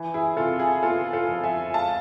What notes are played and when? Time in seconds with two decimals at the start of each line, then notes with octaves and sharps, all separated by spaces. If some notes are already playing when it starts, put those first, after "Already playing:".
Already playing: E3
0.14 E4 G#4
0.36 C3 F4 A4
0.59 E4 G#4
0.82 B3 F4 A4
1.13 F4 A4
1.28 F2
1.44 E5 G#5
1.74 G#3 F5 A5